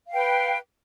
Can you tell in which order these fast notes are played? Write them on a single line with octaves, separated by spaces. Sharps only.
F5 G5 B4